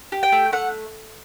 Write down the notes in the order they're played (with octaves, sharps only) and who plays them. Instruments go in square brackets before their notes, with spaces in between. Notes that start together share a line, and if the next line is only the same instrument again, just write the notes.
[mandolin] G4
G5
A3
A3 F#5